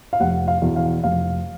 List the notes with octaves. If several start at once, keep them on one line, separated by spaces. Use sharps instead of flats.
F5
F1 F#5
F5
E2 B2
F5
F1 F5